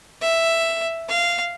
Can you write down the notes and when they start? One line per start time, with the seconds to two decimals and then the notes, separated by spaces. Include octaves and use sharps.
0.22 E5
1.09 F5